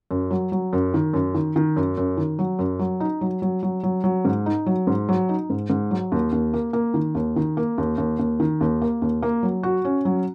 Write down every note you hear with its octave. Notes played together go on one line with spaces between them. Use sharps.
F#2
F#3
F#3
F#2
D#3
F#2
D#3
D#3
F#2
F#2
D#3
F#3
F#2
F#3
D#4
F#3
F#3
F#3
F#3
F#3
G#2
D#4
F#3
G#2
F#3
D#4
G#2
G#2
F#3
D#2
D#2
A#3
A#3
D#3
D#2
D#3
A#3
D#2
D#2
D#2
D#3
D#2
A#3
D#2
A#3
F#3
F#4
C#4
F#3